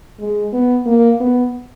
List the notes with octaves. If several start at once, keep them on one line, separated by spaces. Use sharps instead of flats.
G#3
B3
A#3
B3